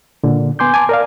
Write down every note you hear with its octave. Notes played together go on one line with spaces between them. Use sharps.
A#2 D3
B3 G#5 C6 D6 G6
G#5 A5 D6
A#4 D5 F5